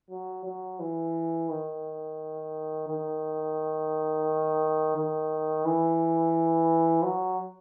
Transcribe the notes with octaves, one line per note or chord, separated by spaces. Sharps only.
F#3
F#3
E3
D#3
D#3
D#3
E3
F#3